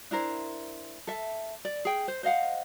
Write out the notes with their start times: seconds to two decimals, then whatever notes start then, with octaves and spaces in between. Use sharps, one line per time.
0.11 D4 E4 A#4 C5
1.07 A4 E5
1.65 D5
1.85 G#4 G5
2.08 C5
2.23 C5 D#5 F5 F#5